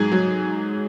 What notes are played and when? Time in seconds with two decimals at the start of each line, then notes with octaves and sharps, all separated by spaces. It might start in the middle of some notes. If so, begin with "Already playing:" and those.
Already playing: G#2 F#3 G#4
0.12 F#3